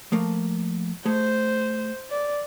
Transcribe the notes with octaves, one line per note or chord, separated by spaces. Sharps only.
F3 A3 A#3
A3 G#4 C5
D5